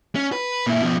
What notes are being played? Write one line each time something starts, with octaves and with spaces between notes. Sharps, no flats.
C#4
B4
A#2 E4
B2 F3